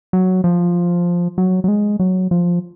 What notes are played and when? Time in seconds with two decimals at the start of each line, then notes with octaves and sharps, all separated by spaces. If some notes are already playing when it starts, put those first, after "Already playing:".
0.13 F#3
0.44 F3
1.38 F#3
1.64 F#3
1.68 G#3
1.99 F#3
2.31 F3